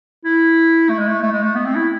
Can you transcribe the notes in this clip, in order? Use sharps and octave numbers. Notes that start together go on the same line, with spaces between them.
E4
A3
G#3
A3
A3
G#3
A3
B3
C4
E4